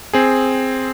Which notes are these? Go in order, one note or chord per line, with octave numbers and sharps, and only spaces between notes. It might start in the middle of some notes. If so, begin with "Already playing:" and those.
C4 G#4